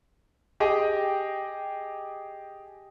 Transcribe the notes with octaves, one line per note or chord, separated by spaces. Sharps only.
G4 G#4 D#5 G5